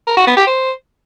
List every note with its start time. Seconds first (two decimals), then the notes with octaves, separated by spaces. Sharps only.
0.07 A#4
0.17 F#4
0.27 B3
0.37 G4
0.47 C5